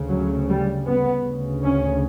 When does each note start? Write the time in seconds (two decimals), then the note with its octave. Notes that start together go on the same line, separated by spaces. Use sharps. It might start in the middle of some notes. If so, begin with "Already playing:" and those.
Already playing: D2 C#3
0.10 F#3
0.48 G3
0.86 B3
1.24 D2 C#3
1.62 C#4